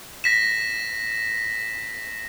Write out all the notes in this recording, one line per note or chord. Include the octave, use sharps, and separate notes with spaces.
A#6 B6 E7